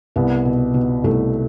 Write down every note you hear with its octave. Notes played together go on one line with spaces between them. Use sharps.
C2 B3
B2
B2
C2 A3